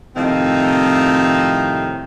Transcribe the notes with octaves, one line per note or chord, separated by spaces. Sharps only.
A2 C3 D#3 F3 C4 D#4